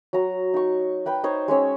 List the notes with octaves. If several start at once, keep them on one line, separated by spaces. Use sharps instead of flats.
F#3 A#5
D#4 C#6
B4 G5 B5
D#4 C5 C#5
G#3 C#4 C#5 E6